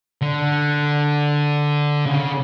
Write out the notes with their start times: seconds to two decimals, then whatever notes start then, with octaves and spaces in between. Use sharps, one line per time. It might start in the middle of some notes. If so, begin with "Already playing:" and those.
0.21 D3
2.06 C#3